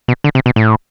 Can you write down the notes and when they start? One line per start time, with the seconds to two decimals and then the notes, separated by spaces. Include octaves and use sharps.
0.08 B2
0.24 D3
0.35 C3
0.46 B2
0.56 A2